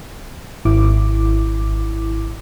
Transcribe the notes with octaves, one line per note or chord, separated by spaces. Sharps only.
G#1 E4 D6